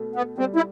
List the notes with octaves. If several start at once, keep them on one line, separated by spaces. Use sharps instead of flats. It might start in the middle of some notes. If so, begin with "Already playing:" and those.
Already playing: B2 A3
B3
G3 C4
E4